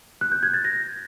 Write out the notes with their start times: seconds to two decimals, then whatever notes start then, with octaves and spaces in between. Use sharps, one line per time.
0.21 F#6
0.32 G6
0.43 G#6
0.54 A6
0.64 A#6